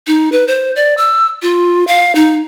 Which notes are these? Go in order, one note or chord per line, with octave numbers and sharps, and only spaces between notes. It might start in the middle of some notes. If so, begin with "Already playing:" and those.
D#4
B4
C5
D5
E6
F4
F5
D#4